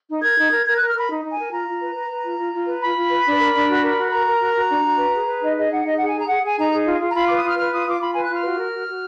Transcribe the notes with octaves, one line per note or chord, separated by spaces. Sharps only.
D#4
A#4 G#6
D#4
A#4
A#4 G#6
A#4 F#6
F6
A#4 B5
D#4
D#4
G#5
A#4
F4 A#5
F4
B4
B4
B4
F4
F4
F4
B4
F4 B5
F4
B4
D4
A#4
D4
F#4
A#4
F#4
A#4 A#5
A#4
F#4
F#4
D4
F#4
B4
G#4
B4
D#4 D#5
G#4 D#5
D#4 F#5
D#4 D#5
G#4 F#5
G#5
G#4 A#5
G#4 F#5
G#4 G#5
D#4 A#5
G#4
F4
F4
A#5
F4 B5
B4 D6
D#6
F4 F6
B4 F6
F4 D#6
F4 D6
F4 B5
B4 G#5
F#6
F4 F6
F#4
A#4
F#4
F#4